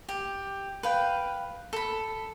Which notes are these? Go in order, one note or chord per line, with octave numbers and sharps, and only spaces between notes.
G4
B4 F5 G5
A4 B5